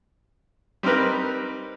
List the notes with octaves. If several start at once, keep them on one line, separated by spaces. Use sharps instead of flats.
G3 C4 D#4 A#4 B4